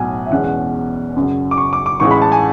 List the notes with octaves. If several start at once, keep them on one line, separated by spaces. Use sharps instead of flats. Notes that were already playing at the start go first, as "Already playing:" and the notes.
Already playing: B1 A2 F#3 F#5 G#5
E5
E2 B2 G#3 C#4 F#5
F#5
F#2 C#3 F#3
D6
C#6
D6
D6
A1 A2 G#3 C#6
B5
A5
G#5